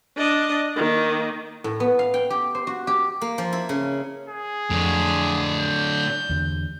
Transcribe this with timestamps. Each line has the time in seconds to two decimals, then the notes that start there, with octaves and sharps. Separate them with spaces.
0.17 D4 D#5
0.76 D#3 A#3
1.64 A2
1.80 B3
1.99 F5
2.14 G5
2.30 G4
2.55 C5
2.67 F#4
2.87 G4
3.22 A#3
3.38 F3
3.53 E4
3.69 C#3
4.28 G#4
4.70 F2 A2 D3
5.60 G6
6.29 E2 D3